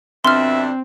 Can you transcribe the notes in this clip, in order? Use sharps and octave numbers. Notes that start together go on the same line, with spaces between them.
F2 B2 C4 D4 E5 C6 F6